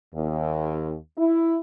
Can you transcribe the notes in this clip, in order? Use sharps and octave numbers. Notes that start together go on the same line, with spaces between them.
D#2
E4